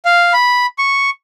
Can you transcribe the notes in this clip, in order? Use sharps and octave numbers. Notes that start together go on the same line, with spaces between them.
F5
B5
C#6